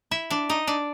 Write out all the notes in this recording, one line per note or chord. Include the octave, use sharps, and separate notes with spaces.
E4 E5
D4 D5
D#4 D#5
D4 D5